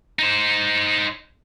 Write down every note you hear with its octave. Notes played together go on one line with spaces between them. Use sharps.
D#4 C5